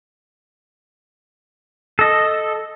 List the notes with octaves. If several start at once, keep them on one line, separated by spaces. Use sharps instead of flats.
A4 D#5